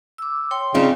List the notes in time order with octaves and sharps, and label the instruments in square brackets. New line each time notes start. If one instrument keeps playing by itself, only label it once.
[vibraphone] D6 E6
C#5 G5 C6
[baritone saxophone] C#3 [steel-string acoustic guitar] C4 D#4 F4 [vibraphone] C#4 D5